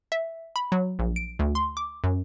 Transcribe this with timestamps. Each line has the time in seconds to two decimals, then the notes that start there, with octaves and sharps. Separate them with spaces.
0.12 E5
0.56 B5
0.72 F#3
0.99 A#1
1.16 D7
1.39 D2
1.55 C6
1.77 D6
2.04 F#2